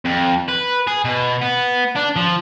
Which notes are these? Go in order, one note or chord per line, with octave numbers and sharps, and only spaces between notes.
F2
B4
G#4
B2
B3
D4
F3